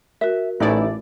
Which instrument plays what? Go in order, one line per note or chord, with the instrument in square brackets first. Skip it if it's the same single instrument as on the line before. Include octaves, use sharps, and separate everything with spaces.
[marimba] F#4 A#4 [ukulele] E5
[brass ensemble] A1 E3 [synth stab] A2 A3 D5 [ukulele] D#4 E4